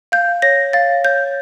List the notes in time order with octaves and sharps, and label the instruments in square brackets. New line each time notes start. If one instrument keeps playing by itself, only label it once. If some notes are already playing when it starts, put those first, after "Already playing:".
[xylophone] F5 G6
C#5 A#6
F5 A6
C#5 G6